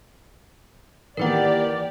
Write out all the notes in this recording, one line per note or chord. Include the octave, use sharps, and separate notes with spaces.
D#3 E3 A#3 G4 A#4 B4 D5 F#5